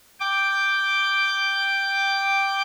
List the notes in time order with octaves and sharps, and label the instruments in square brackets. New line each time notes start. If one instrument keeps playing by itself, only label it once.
[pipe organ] G5 D6